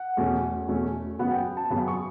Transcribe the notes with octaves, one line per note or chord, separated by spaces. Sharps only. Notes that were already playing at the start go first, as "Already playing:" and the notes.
Already playing: F#5
E2 B2 A3 C#4
E2 B2 A3 C#4
F#2 C#3 F#3 B3 F#5
G5
A5
F#2 C#3 F#3 B3
C#6